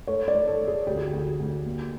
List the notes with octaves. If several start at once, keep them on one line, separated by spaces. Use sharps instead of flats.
A3 C#5
D5
A3
A4
A3
G#4
D2 G4
G#4
G4
D2
D2
A#3